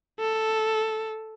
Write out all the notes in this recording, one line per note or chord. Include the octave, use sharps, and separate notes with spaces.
A4